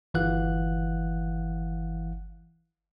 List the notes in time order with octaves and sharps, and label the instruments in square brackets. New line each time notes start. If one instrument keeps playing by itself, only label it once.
[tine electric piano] G1 E3 F5 F#5 F#6